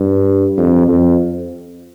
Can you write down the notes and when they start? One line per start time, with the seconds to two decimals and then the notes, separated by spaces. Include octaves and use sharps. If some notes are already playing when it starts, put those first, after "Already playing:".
Already playing: G2
0.57 F2
0.88 F2